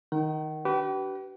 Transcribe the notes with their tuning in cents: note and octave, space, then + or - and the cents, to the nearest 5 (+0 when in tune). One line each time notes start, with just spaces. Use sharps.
D#3 +5 G5 -45
D4 +0 G4 -40 B4 -5